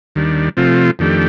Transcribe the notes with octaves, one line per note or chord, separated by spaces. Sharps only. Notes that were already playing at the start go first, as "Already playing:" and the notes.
D#2 D#3 G3 D4
C3 F3 A3 C4 F4
F2 D#3 A3 D4 G4